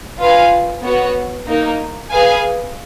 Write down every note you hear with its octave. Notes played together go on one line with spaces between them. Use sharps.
F4 B4 F5 G#5
B3 F#4 C#5 F#5
A#3 D#4 A#4
G#4 B4 F5 G#5